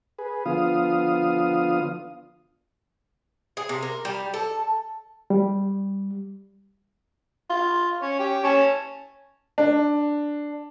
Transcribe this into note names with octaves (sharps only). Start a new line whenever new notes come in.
G#4 B4
D3 F3 B3 F4 F5 D#6
G#4
C3
A#4
G3
A4
G3
F4
C#4 C#5
G4
C#4 C#5 G#5 A5
D4